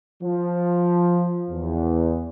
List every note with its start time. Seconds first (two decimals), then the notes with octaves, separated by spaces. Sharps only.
0.23 F3
1.50 E2